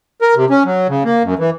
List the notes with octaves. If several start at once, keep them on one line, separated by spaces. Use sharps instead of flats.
A#4
C3
C#4
F#3
C#3
A#3
F#2
E3